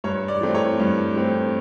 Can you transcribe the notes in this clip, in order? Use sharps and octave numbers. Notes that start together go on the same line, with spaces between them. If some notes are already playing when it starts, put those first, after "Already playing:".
G2 C#5
D5
E3 A3 C4
C#5
G2
E3 A3 C4